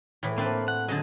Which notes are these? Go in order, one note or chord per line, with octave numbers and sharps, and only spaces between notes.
A2 E3
A#3 C4 D4 B4 C5
F#5
D3 F#3 G#4 D#5